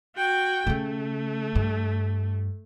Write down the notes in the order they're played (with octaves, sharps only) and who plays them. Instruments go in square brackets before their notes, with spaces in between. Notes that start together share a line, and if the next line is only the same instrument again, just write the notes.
[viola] F#4 G5
[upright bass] C#3 C#4 [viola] A3
[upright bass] G2